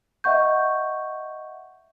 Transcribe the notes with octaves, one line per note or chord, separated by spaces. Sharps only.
D#5 E5 F#5 C#6 G6